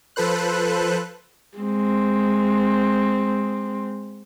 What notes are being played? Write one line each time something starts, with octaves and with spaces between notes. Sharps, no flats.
F3 A4 B4 C5 F#6
G#3 C4